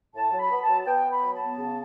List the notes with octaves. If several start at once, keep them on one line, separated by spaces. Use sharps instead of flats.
A2 A5
F#3
B5
B3
A5
F#3
A5
B3 G5
B3
B5
F#3
A5
B3
C#3